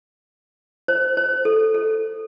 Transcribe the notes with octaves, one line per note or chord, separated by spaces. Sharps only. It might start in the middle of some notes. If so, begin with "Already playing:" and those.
C5
C5
A4
A4